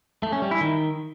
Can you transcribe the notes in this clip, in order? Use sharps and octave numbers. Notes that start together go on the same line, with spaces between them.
A3
C#4
G3
E4
D#3